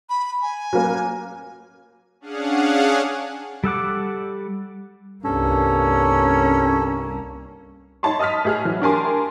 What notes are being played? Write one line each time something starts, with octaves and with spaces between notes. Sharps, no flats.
B5
G#5
F#3 A#3
C#4 D4 G#4 F5 F#5
G3 A4 F#5 D6
C2 G2 A#3 C#4 A4
D#4 C#5 A5 B5 C6
D#5 A5 D#6 F6 B6
A2 G#4 F6
E3 F#3
D4 G4 A#4 G#5 A5 C6